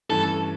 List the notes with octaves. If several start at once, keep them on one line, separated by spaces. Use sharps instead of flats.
G2 E3 A3 C#4 A4